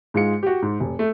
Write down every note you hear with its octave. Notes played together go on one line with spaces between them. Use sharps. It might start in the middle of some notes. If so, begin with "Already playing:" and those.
G#2 G#3 F4 C#7
F#4 G4
G#2
F1
A3